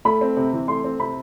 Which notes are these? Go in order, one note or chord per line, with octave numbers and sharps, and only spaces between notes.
A3 B5
C4
C3
E3
A3 C6
C4
C3 B5